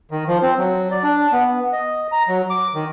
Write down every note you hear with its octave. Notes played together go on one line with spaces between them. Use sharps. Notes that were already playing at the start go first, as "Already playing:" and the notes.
D#3
F3
C4
F#3
D5
D4
B3
D#5
A#5
F#3
D6
D#3